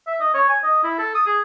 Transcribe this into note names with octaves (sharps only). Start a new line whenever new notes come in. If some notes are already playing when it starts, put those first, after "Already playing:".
E5
D#5
C#5
G#5
D#5
E4
A4
D#6
G#4